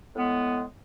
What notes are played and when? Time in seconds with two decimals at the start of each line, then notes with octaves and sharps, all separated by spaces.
0.15 A2 G#3 B3